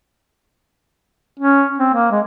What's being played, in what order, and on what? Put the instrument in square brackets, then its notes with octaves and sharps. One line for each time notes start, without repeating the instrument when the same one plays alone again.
[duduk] C#4
C4
A#3
G#3